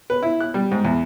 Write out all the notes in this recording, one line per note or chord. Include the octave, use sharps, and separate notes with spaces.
B4
E4
F#6
G3
G#2
E2